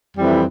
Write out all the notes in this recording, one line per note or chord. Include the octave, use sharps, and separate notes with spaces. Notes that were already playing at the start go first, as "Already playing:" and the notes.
F2 E3 G3 C4 E4